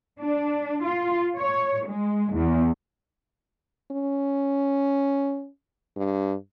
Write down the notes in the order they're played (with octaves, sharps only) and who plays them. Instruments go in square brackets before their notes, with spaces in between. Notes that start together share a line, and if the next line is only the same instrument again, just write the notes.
[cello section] D4
F4
C#5
G#3
E2
[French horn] C#4
G2